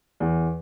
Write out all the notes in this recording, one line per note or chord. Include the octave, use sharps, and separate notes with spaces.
E2